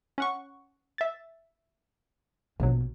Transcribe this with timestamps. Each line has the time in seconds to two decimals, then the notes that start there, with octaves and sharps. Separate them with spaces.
0.18 C#4 F#5 C#6
0.98 E5 A6
2.60 A#1 B2 F#3